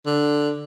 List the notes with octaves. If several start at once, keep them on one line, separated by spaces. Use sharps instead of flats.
D3